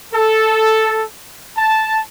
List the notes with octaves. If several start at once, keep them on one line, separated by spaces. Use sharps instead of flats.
A4
A5